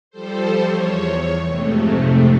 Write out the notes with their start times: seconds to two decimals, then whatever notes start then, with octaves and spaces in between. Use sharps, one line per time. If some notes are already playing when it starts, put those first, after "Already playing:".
0.11 F3 G3 A4 C5
0.62 E2 C#5
1.45 F2 G#2 C3 A3